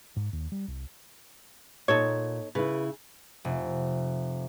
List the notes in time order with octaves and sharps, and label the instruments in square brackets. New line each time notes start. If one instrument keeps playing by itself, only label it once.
[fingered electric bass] G#2
D#2
G3
C2
[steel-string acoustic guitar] A#2 [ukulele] D#4 A4 C#5
[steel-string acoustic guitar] C#3 E4 [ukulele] B4
[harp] F1